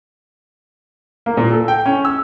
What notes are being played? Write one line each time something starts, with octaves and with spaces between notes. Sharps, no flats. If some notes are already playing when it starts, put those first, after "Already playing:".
A#3
A#2
A4
G5
C#4
E6